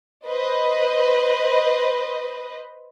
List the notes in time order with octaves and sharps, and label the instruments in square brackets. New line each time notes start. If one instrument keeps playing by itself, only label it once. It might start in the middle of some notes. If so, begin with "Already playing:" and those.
[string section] B4 C5 D#5